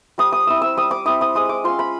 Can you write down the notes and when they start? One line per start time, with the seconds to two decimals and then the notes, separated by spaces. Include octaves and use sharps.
0.18 G3 D#6
0.32 D#6
0.47 C4 E4 E6
0.62 E6
0.77 G3 D#6
0.91 D6
1.06 C4 E4 D#6
1.21 D#6
1.35 G#3 D#6
1.49 D6
1.64 C#4 F4 C6
1.79 B5